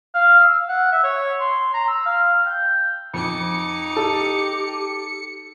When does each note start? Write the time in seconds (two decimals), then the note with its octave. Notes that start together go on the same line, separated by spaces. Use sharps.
0.14 F5
0.40 E6
0.69 F#5
0.92 E5
1.04 C#5
1.40 C6
1.74 A#5
1.88 E6
2.06 F5
2.46 G5
3.13 F2 D#4 D6 C#7
3.97 G4 A4